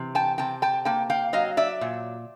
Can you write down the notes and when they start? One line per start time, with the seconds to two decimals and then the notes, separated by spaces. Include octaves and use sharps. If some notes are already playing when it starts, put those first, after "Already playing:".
Already playing: C3 E3
0.15 G5 A5
0.38 C3 G5 A5
0.62 G5 A5
0.85 A#3 G5 A5
1.10 F5 G5
1.33 F#3 D#5 F5
1.57 D5 E5
1.81 A#2